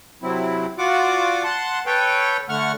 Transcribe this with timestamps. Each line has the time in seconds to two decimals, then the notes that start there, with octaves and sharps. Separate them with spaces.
0.22 C3 F#3 C4 E4
0.78 F4 F#4 D5 F#5 D6
1.44 F#5 A5 C6
1.86 A4 B4 C#5 G5
2.49 D3 A3 F#5 C#6 F6